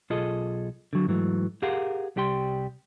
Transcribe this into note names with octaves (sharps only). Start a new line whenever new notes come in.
B1 F4 G#4 A4 D#5
D3 F#3
G#2 E3 F#3 A3
G4 G#4 A#4 F5 F#5
C2 G3 G4 G5 C6